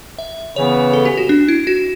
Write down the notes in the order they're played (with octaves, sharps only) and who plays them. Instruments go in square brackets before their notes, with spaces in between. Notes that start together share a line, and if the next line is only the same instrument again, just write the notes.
[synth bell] E5
[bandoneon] C#3 E3 B3 [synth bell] C#5
[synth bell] A4
G4
F#4
D4
E4
F#4